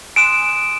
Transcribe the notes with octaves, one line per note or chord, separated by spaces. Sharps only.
G#5 C6 D#6 F#6 D7 E7